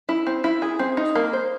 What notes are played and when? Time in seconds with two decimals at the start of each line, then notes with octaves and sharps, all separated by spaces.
0.09 E4
0.27 C4
0.44 E4
0.62 G#4
0.79 C4
0.97 D#4
1.15 A#3
1.33 C5